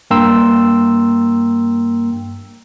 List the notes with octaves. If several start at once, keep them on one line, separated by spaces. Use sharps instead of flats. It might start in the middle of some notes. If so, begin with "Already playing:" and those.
G2 A#3 G5 A#5 C6 E6